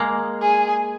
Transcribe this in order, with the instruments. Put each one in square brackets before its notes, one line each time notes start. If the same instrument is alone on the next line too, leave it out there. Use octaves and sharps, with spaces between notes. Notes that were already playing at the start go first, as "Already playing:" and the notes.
Already playing: [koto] G#3 A#3
[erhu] G#4